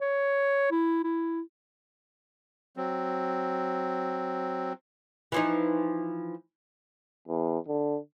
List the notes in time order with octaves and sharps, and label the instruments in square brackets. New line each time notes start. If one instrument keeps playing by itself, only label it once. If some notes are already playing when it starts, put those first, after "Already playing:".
[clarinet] C#5
E4
E4
[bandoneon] F#3 C4
[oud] E3 F3 D#4
[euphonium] E2
D3